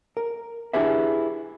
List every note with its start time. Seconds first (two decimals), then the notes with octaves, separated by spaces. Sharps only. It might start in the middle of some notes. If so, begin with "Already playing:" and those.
0.17 A#4
0.73 D4 E4 G4 G#4 B4 E5